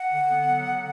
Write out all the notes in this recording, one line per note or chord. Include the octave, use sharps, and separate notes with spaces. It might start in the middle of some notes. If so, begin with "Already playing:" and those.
Already playing: F#5
D3
B3
F#3
D3